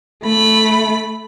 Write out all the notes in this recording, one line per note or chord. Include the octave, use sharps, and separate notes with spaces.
A3 B5